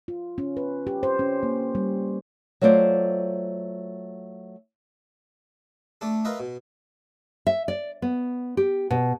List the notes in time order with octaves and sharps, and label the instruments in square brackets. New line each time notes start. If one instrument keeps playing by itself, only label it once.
[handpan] F4
C#4
B4
G4
C5
C#4
A#3
G3
[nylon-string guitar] F#3 A3 F4 C5 D5
[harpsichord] A3 D4 A4
F4 A#4 B4 D#5 E5
B2
[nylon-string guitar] E5
D5
B3
G4
B2